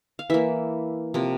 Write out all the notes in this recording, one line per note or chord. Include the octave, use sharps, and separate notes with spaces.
F5
E3 A#3 E5
C3 F3 A#3